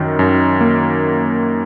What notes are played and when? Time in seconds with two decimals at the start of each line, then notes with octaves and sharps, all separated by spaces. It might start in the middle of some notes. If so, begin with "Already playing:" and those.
Already playing: F#2 D#3
0.19 F#2
0.61 A#3